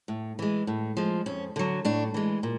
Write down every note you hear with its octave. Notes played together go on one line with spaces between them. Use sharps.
A2
E3 G#3
A2
F3 G#3
F2 C#4
D3 F#3
A2 D4
E3 G#3
A#2